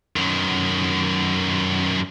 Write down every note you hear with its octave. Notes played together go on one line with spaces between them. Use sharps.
F#2 D#3